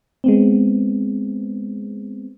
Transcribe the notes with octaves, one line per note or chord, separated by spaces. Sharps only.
G#3 B3 C4